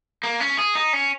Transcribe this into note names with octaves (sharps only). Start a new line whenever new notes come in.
A#3
C#4
G#4
D#4
C#4